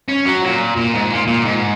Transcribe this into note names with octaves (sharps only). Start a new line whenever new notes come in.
C#4
F#3
A#2
A#2
G#2
A#2
A#2
G#2